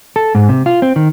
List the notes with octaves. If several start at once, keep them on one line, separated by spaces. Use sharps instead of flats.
A4
G#2
C3
F4
C4
D#3